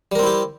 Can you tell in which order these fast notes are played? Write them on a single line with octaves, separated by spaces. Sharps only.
G3 A#4 C4 E4 G4